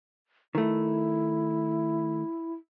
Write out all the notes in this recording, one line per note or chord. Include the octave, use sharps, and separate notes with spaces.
D#3 A3 E4